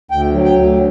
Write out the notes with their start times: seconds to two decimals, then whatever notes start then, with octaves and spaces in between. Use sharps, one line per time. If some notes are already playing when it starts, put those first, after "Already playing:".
0.11 D2 G5
0.34 F#3
0.45 G5
0.55 D2